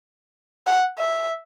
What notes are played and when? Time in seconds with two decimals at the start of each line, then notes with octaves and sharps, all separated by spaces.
0.67 F#5
0.98 E5